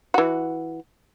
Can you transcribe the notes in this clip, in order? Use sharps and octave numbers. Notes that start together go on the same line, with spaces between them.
E3 F#4